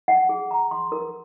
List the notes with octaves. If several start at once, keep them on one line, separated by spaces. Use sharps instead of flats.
F#5
G#4
A#5
C6
A#4